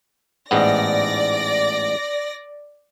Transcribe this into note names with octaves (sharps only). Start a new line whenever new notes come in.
A1 G#2 B3 D5 A#6